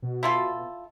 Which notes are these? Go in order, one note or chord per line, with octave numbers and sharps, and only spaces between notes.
B2
E4 F4 A4